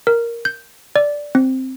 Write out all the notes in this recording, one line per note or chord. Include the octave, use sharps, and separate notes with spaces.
A#4
G6
D5
C4